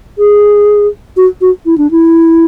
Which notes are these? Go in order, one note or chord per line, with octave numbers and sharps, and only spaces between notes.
G#4
F#4
F#4
E4
D4
E4